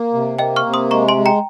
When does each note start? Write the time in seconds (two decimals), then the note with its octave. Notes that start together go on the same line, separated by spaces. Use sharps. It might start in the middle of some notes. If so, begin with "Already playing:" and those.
Already playing: A#3
0.14 C3
0.39 A#3 D#5 G5
0.56 C#6 F6
0.66 C3
0.74 C6 D#6
0.91 G#3 A#5 C#6
1.08 G#5 C6
1.17 G#3
1.26 G5 A#5